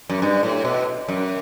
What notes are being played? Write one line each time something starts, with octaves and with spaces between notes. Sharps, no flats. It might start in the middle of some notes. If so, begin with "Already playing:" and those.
F#2
G2
A2
B2
F#2